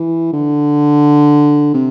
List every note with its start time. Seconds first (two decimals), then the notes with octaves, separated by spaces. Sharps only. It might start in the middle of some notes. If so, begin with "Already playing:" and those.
Already playing: E3
0.33 D3
1.74 C3